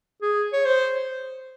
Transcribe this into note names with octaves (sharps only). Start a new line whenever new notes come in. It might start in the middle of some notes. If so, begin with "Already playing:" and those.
G#4
C#5
C5